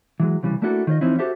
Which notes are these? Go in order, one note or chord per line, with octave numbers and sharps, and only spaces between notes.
E3 F#3 G#3
C2 C#3 E3 G3
A3 A#3 D4 E4 F#4 A4
D#3 F4 C#5 D#5
E3 F3 C4 C#4 D#4 E4
F#4 G4 A4 C5 E5